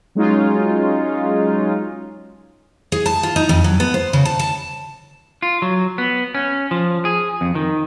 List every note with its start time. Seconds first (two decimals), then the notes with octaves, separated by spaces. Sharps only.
0.15 F#3 G#3 C#4 D#4 F4
2.92 G#4
3.06 A5
3.23 F4
3.36 D#4
3.49 F2
3.64 F#3
3.80 B3
3.94 C5
4.13 C#3
4.25 A5
4.39 A5
5.42 F4
5.62 F#3
5.98 B3
6.35 C#4
6.71 F3
7.05 G#4
7.41 F2
7.55 D#3